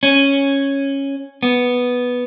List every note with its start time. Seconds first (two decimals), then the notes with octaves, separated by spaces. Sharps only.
0.03 C#4
1.43 B3